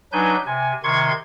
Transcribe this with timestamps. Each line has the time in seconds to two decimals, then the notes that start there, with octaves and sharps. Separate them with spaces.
0.12 F#3 D4 D#4 B4 G#5 G6
0.46 C3 G#5
0.83 C3 D#3 C6 C#6 G#6